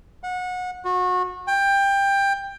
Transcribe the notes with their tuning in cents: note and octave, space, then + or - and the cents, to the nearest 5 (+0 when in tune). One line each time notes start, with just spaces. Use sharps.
F#5 -25
F#4 -30
G5 +15